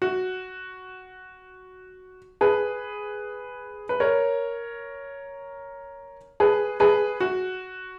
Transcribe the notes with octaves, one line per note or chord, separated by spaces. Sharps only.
F#4
G#4 B4
B4
A#4 C#5
G#4 B4
G#4 B4
F#4